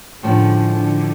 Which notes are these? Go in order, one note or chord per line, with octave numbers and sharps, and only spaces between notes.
A2 D3 F3 G#3 C#4
D3